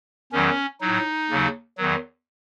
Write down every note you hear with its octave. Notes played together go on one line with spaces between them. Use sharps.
E2 D#3 F#3 C#4
A2 F#3 D#4
D#2 C#3 F#3
E2 D#3 F#3